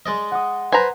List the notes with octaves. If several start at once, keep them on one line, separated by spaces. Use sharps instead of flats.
G#3 D5 D#5
F#5 D#6
B4 C5 G#5 A#5